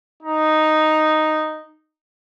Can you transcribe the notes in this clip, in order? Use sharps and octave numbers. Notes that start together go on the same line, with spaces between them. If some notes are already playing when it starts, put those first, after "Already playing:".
D#4